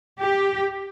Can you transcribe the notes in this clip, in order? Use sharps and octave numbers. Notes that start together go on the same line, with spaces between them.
G4